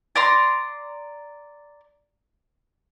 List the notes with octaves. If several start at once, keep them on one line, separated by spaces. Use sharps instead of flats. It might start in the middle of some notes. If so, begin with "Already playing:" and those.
D5 A#5 C6